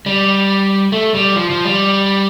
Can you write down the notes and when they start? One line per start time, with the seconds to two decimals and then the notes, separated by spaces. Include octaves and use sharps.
0.06 G3
0.92 A3
1.14 G3
1.36 F3
1.50 F3
1.65 G3